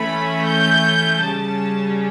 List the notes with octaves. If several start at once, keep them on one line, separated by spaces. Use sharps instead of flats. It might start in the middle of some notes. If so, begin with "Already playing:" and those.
Already playing: E3 A3 C#4 B5
G6
C#3 G3 C#4 A5